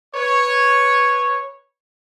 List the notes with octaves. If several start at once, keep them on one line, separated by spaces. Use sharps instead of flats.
B4 C#5